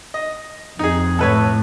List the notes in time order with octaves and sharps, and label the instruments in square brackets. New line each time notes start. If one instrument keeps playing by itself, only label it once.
[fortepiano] D#5
[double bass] F2 [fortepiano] D#4 G#4
[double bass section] A2 [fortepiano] A4 B4 C#5